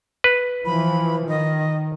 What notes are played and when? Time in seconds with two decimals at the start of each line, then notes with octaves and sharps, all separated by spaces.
0.24 B4
0.66 E3 F3 B5
1.28 D#3 D#5